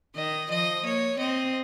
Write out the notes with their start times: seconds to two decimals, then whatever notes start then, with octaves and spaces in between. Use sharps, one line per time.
0.15 D#3 D#5
0.50 F3 D#5
0.85 A#3 C#5
1.19 C4 D#5